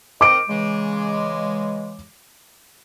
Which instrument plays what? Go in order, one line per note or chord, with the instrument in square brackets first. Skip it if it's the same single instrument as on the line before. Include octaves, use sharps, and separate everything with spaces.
[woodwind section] C4 A#4 D#5 [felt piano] D6 D7
[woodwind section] C#3 E3 G#3